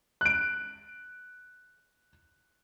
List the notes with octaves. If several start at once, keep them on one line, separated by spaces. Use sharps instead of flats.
F#6 D7